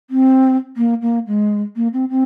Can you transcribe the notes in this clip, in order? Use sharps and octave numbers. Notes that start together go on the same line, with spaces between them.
C4
A#3
A#3
G#3
A#3
C4
C4